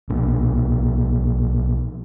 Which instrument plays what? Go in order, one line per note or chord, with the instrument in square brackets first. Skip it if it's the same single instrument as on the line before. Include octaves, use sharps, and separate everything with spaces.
[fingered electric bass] B1 A#2